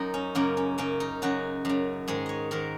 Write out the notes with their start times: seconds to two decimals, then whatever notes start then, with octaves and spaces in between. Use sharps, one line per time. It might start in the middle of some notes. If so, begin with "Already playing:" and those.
Already playing: F#2 D#4
0.14 C#4
0.35 F#2 C#3 A#3
0.57 C#4
0.78 F#2 C#3 C#4
1.00 D#4
1.22 F#2 C#3 F#4
1.65 F#2 C#3
2.08 G#2 D#3 G#4
2.26 C#5 D#5
2.51 G#2 D#3 A#4